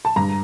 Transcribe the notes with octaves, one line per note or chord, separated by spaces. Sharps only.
A5
G2 A#5